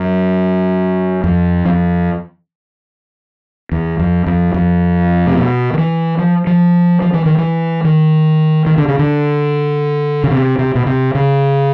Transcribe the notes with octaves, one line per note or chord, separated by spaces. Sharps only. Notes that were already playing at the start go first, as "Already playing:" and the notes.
Already playing: F#2
F2
F2
E2
F2
F2
F2
C3
B2
D#3
E3
F3
F3
F3
E3
D#3
E3
D#3
D#3
D3
C#3
D3
C#3
C3
C3
B2
C3
C#3